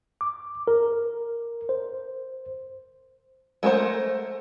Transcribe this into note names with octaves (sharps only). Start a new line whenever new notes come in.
D6
A#4
C5
G#3 A3 A#4 C5 F#5